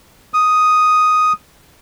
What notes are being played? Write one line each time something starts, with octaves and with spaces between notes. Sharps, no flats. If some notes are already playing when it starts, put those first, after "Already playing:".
D#6